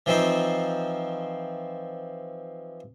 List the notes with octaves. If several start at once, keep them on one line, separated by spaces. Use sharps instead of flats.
E3 F3 C4 D#4 C5